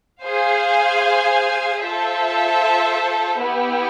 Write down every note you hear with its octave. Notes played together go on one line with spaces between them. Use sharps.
G#4 C5 F5 G#5
F4 A4 C5 E5
B3 E4 G4